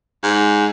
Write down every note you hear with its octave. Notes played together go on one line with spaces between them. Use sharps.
G#2